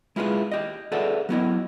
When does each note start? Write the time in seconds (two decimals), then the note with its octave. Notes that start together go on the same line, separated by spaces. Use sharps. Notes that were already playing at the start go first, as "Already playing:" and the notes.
0.16 G#3 E4 F4 G#4 B4
0.52 G4 D#5
0.92 G#4 A4 B4 D5 E5 F#5
1.29 F#3 B3 E4 D#5